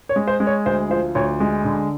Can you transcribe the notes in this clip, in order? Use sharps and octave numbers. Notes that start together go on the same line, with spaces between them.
C#5
G#3
C5
G#3
C#5
D2 C5
F3 C5
D2 C#5
G#3
D3